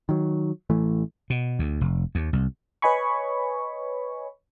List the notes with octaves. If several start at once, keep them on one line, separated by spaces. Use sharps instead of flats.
D#3 F#3
A1 E3 A3
B2
D2
F1
D#2
C2
B4 C#5 D#5 G#5 B5 C#6